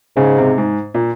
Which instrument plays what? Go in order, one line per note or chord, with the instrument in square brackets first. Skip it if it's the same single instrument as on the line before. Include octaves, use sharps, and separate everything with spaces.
[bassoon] G#2 [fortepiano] C#3
[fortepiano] C3
G#2
A#2